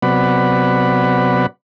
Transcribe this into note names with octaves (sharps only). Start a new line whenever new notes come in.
C3 F#3 B3 D5 F#5 B5